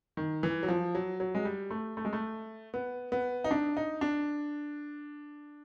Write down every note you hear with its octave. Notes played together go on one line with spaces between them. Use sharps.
D#3
E3
F#3
F3
F#3
F#3
G#3
G3
A3
A3
G#3
A3
B3
B3
D#4
D4
D#4
D4